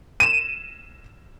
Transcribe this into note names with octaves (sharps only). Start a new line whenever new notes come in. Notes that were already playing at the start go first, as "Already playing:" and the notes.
D#7 E7